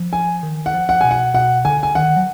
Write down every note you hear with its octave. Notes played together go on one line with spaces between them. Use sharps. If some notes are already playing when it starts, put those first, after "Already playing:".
Already playing: F3
G#5
D#3
F#5
F3
F#5
B2 G#5
F#5
B2 F#5
D3 G#5
G#5
D#3 F#5
F#3